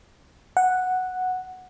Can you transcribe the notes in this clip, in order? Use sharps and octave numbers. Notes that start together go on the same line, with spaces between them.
F#5